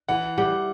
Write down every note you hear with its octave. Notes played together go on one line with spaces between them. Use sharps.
E3 F#5
G3 F#5